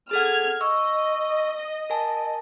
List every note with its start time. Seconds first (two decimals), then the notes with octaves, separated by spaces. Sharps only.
0.11 G#4 A4 F#5 F6 G#6
0.61 D#5 C#6 E6
1.90 A#4 G#5 A5